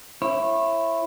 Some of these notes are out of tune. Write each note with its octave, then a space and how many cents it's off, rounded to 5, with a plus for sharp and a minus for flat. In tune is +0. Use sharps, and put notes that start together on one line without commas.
E4 +10 C#5 -30